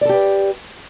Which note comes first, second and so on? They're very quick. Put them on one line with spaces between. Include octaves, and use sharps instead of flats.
D5 A4 G4 B4